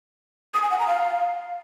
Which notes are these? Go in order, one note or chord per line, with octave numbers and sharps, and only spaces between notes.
D#6
G#5
F#5
A#5
F5